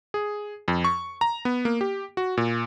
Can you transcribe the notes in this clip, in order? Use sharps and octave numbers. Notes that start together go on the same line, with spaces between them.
G#4
F2
C#6
A#5
B3
A#3
G4
F#4
A#2